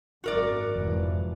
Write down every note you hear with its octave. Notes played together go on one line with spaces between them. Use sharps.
G#1 F#2 F#4 A#4 D5
F1 G#2 E3 F3